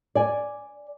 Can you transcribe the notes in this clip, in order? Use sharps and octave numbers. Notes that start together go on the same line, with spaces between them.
D5 G#5